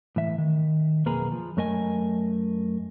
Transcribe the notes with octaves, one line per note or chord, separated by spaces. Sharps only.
A2 E3 E5
D#3
B1 F2 A#3 G#4 B4 A#5
F3
F#2 A3 A#4 D#5 G#5